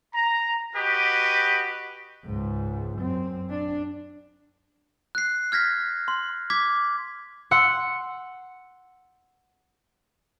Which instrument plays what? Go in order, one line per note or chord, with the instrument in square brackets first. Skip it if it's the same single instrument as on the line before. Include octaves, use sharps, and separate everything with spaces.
[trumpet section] A#5
F#4 G4 B4 D#5
[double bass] C#2 G#2
F#2 C4
D4
[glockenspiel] F#6 C7
F6 G#6 A#6 B6
C6
D6 G#6 B6
[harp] F#5 C6 E6 C#7